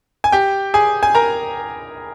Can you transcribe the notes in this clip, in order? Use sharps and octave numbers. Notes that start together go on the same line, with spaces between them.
G#5
G4 G5
G#4 G#5
G#5
A#4 A#5